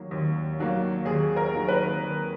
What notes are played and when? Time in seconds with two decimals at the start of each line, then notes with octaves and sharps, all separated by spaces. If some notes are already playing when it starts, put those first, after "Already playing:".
Already playing: D#2 D#3 F#3 A#3
0.11 D#2
0.58 D#3 F#3 A#3
1.05 D#2 G#4
1.36 A#4
1.52 D#3 F#3 A#3
1.68 B4
1.99 D#2